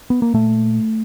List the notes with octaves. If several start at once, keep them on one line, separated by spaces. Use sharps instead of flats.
B3
A#3
A#2 A3